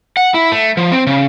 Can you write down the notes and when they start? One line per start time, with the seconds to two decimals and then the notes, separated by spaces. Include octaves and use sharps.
0.17 F#5
0.34 E4
0.52 A3
0.77 F3
0.92 C4
1.07 C#3